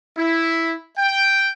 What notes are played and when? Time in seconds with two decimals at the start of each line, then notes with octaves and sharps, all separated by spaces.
0.18 E4
0.98 G5